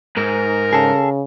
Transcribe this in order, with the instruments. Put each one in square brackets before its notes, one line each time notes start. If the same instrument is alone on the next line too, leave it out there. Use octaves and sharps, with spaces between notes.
[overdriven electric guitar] G#2 [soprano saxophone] A#4
[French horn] C#3 [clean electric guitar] G#4 A4